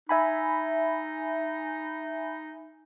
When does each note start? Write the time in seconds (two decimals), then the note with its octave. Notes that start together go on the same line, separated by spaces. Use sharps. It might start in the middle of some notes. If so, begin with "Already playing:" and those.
0.09 D#4 E5 G#5 B5